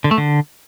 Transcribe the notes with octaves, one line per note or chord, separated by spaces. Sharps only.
D3
A3
D3